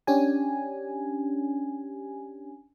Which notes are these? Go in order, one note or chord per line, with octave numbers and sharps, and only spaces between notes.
C#4 D4 G4 G#5